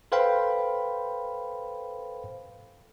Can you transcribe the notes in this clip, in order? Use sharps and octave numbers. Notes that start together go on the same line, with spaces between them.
A4 B4 C5 F5 G5 B5